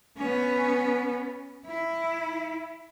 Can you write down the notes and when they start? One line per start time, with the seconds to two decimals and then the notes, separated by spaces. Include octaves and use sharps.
0.18 B3 C#4
1.66 E4